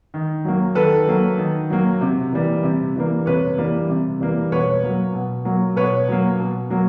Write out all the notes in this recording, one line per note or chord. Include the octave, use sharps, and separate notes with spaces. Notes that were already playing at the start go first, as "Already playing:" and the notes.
D#3
F#3 A#3
D#3 A4 B4
F#3 A#3
D#3
F#3 A#3
C3
E3 G3 A#3
C3
E3 G3 A#3
C3 B4 C#5
E3 G3 A#3
C3
E3 G3 A#3
B2 B4 C#5
F#3 A#3
B2
F#3 A#3
B2 B4 C#5
F#3 A#3
B2
F#3 A#3